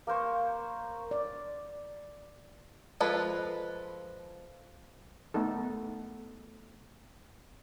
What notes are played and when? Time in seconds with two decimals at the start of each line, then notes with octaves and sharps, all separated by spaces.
0.07 A#3 A#4 C5 C#5
1.11 D5
3.01 F3 G#3 A4 B4
5.34 A3 B3 D#4 A4